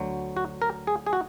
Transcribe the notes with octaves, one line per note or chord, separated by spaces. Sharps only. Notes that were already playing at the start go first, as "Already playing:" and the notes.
Already playing: D2 D3 F#3
F#4
A#4
G#4
G#4
F#4